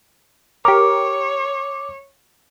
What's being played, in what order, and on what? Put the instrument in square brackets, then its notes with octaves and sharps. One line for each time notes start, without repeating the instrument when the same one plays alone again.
[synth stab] G4 A#4 [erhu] C#5 [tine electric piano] D6